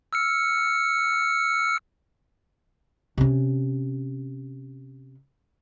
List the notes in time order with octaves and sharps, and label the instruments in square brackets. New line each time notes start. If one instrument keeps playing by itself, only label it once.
[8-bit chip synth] E6 F6 C#7
[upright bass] C3 C#4